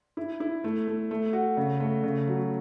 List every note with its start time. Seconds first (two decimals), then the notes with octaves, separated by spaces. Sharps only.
0.17 E4
0.40 E4
0.64 A3
0.88 A3
1.11 A3
1.33 F#4
1.57 C#3
1.80 A3
2.04 C#3
2.28 F#3